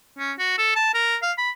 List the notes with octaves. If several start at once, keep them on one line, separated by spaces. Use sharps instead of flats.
C#4
F#4
A4
A5
A#4
F5
B5